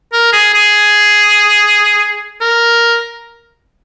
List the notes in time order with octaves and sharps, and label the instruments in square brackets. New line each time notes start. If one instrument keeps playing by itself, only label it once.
[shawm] A#4
G#4
G#4
A#4